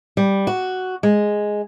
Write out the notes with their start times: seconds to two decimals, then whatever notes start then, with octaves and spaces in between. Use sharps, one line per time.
0.17 G3
0.47 F#4
1.03 G#3